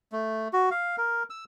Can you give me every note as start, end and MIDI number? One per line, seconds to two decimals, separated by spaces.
0.12 0.48 57
0.53 0.70 66
0.71 0.96 77
0.98 1.23 70
1.30 1.45 88